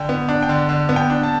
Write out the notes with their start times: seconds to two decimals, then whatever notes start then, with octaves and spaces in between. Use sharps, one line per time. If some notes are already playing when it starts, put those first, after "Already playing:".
Already playing: D3 G5
0.09 B3
0.29 D4
0.43 G5
0.49 D3
0.69 D3
0.89 B3
0.96 G5
1.10 D4
1.23 A5